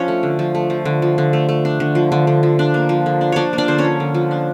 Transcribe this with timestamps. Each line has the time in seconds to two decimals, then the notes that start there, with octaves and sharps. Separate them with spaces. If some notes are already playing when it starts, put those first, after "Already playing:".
Already playing: F3 C#4 D4 C#5
0.08 A3
0.23 D3
0.39 F3
0.55 A3
0.70 F3
0.85 D3
1.02 F3
1.18 D3
1.33 A3
1.49 A3
1.65 D4
1.80 D3
1.95 F3
2.12 D3
2.27 D3
2.43 F3
2.59 D4
2.74 A#3
2.89 F3
3.06 D3
3.21 D4
3.32 F3 D4 C#5 D5
3.53 A#3
3.58 D4 D5
3.68 D3 C5
3.78 C#4 C#5
3.84 F3
4.00 D3
4.14 F3
4.31 D4